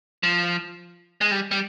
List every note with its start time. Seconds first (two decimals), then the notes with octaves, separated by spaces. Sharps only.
0.23 F3
1.21 G#3
1.31 G3
1.51 G3